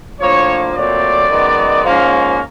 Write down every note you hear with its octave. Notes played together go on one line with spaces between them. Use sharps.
A2 F3 A#3 D4 C#5
A#2 F#3 A3 C4 D5
F#2 D#3 G#3 B3
G#2 F3 A#3 C#4